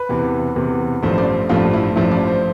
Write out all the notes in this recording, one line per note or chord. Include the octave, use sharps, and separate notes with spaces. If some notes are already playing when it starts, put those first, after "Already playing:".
Already playing: B4
E2 C3 E3
E2 C3 E3
A1 G2 F3 A3 C5
C5
D5
A1 G2 F3 A3 F4
E4
A1 G2 F3 A3 E4
D5
C5